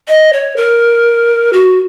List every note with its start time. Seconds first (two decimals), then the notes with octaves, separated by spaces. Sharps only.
0.09 D#5
0.33 C#5
0.57 A#4
1.53 F#4